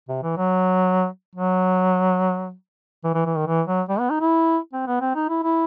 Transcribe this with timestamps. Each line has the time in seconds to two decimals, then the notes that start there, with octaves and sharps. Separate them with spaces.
0.09 C3
0.23 E3
0.37 F#3
1.36 F#3
3.04 E3
3.15 E3
3.26 E3
3.36 D#3
3.47 E3
3.67 F#3
3.89 G3
3.99 B3
4.10 D#4
4.21 E4
4.73 C4
4.87 B3
5.01 C4
5.15 D#4
5.29 E4
5.43 E4